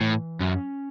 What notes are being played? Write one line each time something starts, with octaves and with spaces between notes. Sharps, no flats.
A2 E3
F#2 C#4